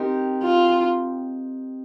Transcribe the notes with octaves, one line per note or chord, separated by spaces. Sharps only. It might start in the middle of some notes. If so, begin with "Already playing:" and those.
Already playing: C4 D#4 G4 A#4
F4